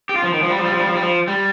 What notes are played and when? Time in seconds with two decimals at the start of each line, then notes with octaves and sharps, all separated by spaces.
0.09 G4
0.15 F4
0.24 F3
0.34 D#3
0.43 F3
0.50 G3
0.58 F3
0.65 G3
0.72 F3
0.80 G3
0.87 F3
0.94 G3
1.02 F3
1.27 G3